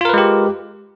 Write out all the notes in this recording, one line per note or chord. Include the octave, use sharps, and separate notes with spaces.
G#3 F4 G4 A#4 B4